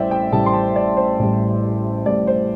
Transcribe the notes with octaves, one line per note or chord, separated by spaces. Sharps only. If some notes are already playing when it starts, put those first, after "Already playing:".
Already playing: A1 A2 G3 C5 D5 E5 G5
G5
A1 A2 G3 A5
C6
A5
D5
C5
A1 A2 G3
A1 A2 G3 D5
C5